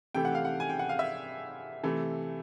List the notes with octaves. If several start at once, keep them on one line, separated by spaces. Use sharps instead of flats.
C3 E3 A3 G5
F#5
F5
F#5
G#5
G5
F#5
F5
E5
C3 E3 A3